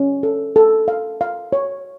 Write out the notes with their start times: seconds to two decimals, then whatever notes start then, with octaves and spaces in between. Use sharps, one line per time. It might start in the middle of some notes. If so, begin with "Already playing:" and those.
Already playing: C#4
0.23 A4
0.56 A4
0.88 F5
1.21 F5
1.53 C#5